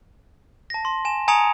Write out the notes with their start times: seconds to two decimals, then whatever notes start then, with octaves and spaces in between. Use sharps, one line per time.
0.70 A5 A#6
0.85 C6
1.05 G#5 E7
1.28 G#5 A#5 D#6 G#6 C#7 F7